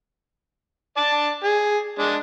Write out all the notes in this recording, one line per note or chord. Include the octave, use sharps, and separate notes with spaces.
D5 A5
G#4
G#3 D4